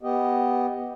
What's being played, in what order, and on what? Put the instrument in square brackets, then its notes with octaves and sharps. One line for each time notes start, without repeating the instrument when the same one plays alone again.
[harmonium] B3 G4 D#5